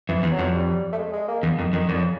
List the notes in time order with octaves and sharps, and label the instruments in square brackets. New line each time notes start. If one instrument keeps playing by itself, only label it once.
[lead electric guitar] F2 [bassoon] E3
[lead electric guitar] E2
[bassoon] F#3
[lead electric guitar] F2
[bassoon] G3
A3
G#3
G#3
A#3
[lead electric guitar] E2
[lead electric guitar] F2 [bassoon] D#3
[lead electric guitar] F2 [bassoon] D#3
[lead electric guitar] F2 [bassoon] D3
[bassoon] C#3